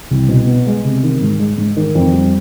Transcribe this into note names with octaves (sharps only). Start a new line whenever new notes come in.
C2
B2
B3
G#3
C3
D#3
G#2
G#3
G#2
D#3
F2
G3